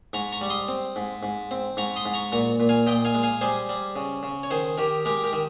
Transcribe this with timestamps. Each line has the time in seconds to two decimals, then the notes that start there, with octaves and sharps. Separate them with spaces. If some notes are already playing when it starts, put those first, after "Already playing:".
0.13 G#2 A#5 C#6
0.32 A#5 C#6
0.41 G3
0.50 C6 D#6
0.68 C4
0.96 G#2
1.23 G#2
1.51 C4
1.77 G#2 A#5 C#6
1.96 C6 D#6
2.06 G#2
2.14 A#5 C#6
2.32 A#2 A#5 C#6
2.60 A#2
2.69 F5 G#5
2.86 A#2 D#5 G5
3.05 F5 G#5
3.15 G#3
3.23 F5 G#5
3.41 G3 G#4 C5
3.69 G3
3.96 C#3
4.23 C#3
4.43 C#5
4.51 D#3 G#4 C5
4.78 D#3 G4 A#4
5.05 G#3 G4 A#4
5.24 G4 A#4
5.33 D#3